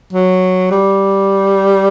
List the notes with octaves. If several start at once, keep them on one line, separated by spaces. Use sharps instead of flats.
F#3
G3